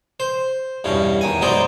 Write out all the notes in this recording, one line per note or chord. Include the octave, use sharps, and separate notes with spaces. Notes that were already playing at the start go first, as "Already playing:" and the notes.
C5
E2 G2 B2 C#4
E2 D#3 G#5
F#2 B2 G#3 D#4 C5 D5